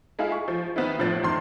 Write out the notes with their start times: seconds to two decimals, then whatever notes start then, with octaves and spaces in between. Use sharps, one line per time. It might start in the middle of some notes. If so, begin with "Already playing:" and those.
0.19 G#3 E4 F4 G#4 F5
0.32 C#6
0.48 F3
0.76 D#3 B3 C4 E4
0.99 A2 F3 D4 A6
1.22 G#1 E2 D#3 C6